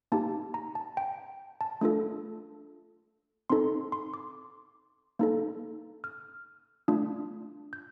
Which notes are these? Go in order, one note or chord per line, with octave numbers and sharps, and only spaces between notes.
A#3 D#4 G4 A5
A#5
A5
G5
A5
A3 D4 F4 A4
C4 D#4 A4 C6
C6
D6
A#3 D#4 A4
F6
A3 D4 F4
G6